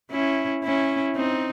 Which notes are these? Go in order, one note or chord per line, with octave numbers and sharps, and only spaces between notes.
C#4 E4
C#4 E4
C4 D#4